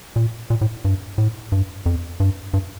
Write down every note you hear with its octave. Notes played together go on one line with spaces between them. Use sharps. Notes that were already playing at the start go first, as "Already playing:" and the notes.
A#2
A#2
A2
G2
A2
G2
F2
G2
G2